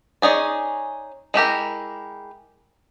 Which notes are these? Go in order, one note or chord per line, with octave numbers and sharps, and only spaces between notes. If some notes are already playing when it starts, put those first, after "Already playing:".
C#4 D#4 G#4 D5
G#3 E4 G4 A#4